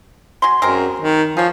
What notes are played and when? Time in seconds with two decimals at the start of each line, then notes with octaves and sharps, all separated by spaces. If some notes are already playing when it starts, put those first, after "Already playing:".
0.42 F#3 G#5 C6
0.62 F#2 G#3 C4 A#4
1.00 D#3
1.37 F3 G#4 C#5